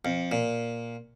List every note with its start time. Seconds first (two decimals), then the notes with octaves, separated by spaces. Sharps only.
0.05 F2
0.32 A#2